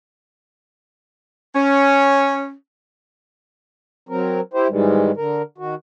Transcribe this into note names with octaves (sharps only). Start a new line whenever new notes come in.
C#4
F#3 C4 A#4
E4 G4 C5
G#2 D#3 E3 G3 G#3
D3 A#4
D#3 F#4